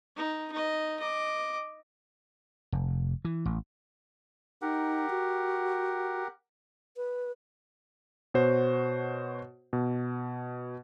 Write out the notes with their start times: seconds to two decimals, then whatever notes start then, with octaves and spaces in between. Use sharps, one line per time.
0.17 D#4
0.52 D#4 D#5
1.00 D#5 D6
2.72 F1
3.25 E3
3.46 A1
4.62 D#4 G4 A#4 F#5
5.10 F#4
6.97 B4
8.34 B2 F#4 C5 C#5
9.73 B2